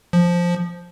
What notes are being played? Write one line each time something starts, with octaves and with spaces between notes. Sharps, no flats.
F3